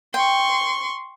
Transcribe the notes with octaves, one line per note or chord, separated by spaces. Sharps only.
G5 C6 C#6